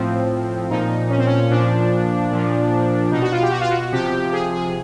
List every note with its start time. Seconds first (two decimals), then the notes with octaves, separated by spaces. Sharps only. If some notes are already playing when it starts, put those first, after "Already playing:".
Already playing: A2 F3 C4
0.70 A#2 F3 D#4
1.10 C#4
1.18 C4
1.27 C#4
1.50 A#2 F3 D4
2.31 A#2 F3
3.12 B2 D#4
3.22 F#4
3.32 F4
3.42 G4
3.51 F#4
3.61 F4
3.71 F#4
3.92 C3 F3 G4
4.33 G#4
4.53 G#4